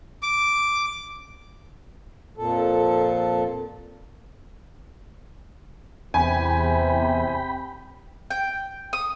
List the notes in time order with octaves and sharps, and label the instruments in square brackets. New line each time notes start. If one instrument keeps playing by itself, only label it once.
[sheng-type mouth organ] D6
[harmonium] F2 A#2 A4
[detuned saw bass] E2 [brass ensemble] C3 [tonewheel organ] G5 B5 [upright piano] G#5
[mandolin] G5
D#6